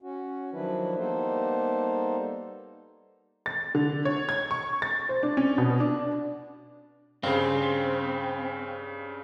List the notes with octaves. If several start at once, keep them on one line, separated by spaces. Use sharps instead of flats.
C#4 F#4
D#3 F3 F#3 D4 E4 B4
G3 A#3 B3 D#4 A4 C5
A6
D3
C#5
G#6
C#6
A6
C5
D4
C#4
B2
D4
G2 C#3 C4 G#4 C5 F5